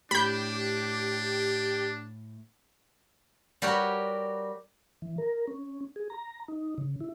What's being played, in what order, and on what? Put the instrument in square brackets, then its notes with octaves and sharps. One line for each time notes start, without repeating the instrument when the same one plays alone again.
[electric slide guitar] A2 [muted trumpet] D4 [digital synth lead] G4 [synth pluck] B5 G6
[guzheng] G3 F#4 G4 A#4 B4 C#5
[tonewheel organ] E3
A#4
C#4
G#4
A#5
D#4
C#3
E4